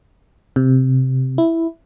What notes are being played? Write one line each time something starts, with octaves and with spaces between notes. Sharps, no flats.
C3
E4